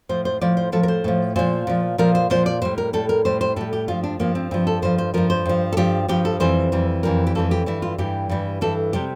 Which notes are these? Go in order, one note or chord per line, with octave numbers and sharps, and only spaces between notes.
A2 F3 C5
C5
A2 F3 D5
C5
A2 F3 A4
A#4
C5
A2 F3
A#2 F3 C5
A#2 F3
A#2 F3 A#4
C5
A#2 F3 C5
D5
A2 G3 C5
A#4
A2 G3 A4
A#4
A2 G3 C5
C5
A2 G3 A4
G4
G2 F3 F4
D4
G2 F3 A#3
C4
G2 F3 C4
A4
G2 F3 C5
C5
G2 F3 A#4
C5
G2 F3
A4
G2 F3 G4
G2 F3 G4
A4
F2 E3 G3 C5
F2 E3 G3
F2 E3 G3 A#4
G4
F2 E3 G3 A4
G4
G2 E3 G3 E4
F4
G2 E3 G3 G4
G2 E3 G3
G2 E3 G3 A4
C3 G3 G4